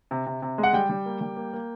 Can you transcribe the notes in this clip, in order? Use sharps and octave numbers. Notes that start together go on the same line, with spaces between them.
C3
C3
C3
G#3
F#5
G3 G5
G3
A#3
G3
A#3
A#3